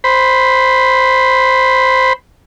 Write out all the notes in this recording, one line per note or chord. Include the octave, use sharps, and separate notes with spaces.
C5 B5